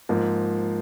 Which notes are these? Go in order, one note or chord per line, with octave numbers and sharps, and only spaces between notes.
G#2 F3 A#3